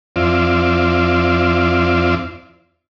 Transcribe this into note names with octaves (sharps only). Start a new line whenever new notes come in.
F2 C4 E4 F4 D5